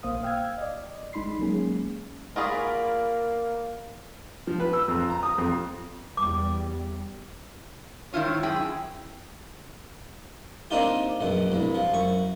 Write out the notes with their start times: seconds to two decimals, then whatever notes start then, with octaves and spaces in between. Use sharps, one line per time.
0.03 A#1 A#3 C5 F5 D#6
0.23 F5 G5 E6 F6 G#6
0.58 D5 D#5
1.13 A1 G#3 D#4 B5 C6 C7
1.39 F#3 G#3 A#3 C#4 G#4
2.36 A#3 F4 F#4 G#4 A#4 D5 B5
4.47 F3
4.60 B4
4.73 E6
4.88 F2
5.10 A#5
5.23 D#6
5.38 F2
6.17 E2 G3 D6
8.13 G#2 D#3 E4 F4 C#5
8.43 F#2 E4 G#4 G5
10.71 A#3 C4 D4 D#4 F4 G4
11.21 A#1 F#2 B2
11.52 C2 G2
11.74 F3
11.94 F#2 C#6